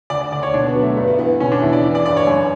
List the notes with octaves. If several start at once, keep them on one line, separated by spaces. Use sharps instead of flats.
D2 D5
D5
D2 D5
C#5
B2 D4
B3
F#3
A3
G2 B3
B3
E3 B3
B2 C#4
D4
E2 E4
D5
E3
D5
G2 D5
C#5
F#2